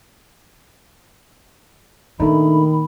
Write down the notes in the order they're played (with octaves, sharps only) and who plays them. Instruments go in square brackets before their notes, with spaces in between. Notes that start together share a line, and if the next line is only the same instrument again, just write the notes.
[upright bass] A#2 [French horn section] D#3 [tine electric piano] A3 D4 D#4 [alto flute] B5